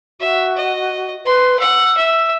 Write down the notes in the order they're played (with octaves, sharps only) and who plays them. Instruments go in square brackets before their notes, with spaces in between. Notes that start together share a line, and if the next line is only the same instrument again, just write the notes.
[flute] F#4 [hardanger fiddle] E5
[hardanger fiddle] D#5
[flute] B4 [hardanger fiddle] C6
[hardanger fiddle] F#5 [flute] E6
[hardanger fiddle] E5